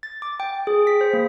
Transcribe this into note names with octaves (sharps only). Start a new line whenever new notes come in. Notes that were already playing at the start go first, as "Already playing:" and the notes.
A6
D6
G5
G#4
B6
C5
A#3